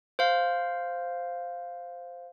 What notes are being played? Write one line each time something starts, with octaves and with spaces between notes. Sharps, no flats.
C5 F5